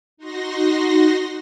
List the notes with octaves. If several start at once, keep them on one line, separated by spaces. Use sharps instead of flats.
D#4 F#4 C6 A#6